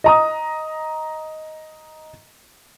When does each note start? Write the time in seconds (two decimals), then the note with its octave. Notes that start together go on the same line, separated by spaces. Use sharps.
0.04 D#5 A#5 D#6